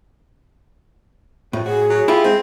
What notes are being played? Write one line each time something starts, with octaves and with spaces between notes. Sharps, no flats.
F2 A2
F#4 G#4
F#3
E4 F4 G4
G#3 C4